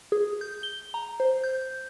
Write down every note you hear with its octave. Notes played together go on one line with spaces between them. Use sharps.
G#4
G6
G7
A#5
C5
G6